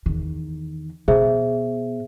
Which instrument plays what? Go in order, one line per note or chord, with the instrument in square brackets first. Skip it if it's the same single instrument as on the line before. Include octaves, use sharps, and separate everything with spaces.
[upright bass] E2 D#3
[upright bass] B2 [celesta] G#4 C5 E5